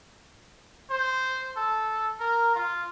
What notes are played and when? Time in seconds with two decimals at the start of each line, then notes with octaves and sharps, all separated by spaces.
0.90 C5
1.57 A4
2.20 A#4
2.55 F4